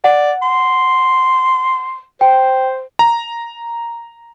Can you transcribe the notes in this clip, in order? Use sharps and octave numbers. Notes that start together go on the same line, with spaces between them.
D5 F#5
C6
C5 G5
A#5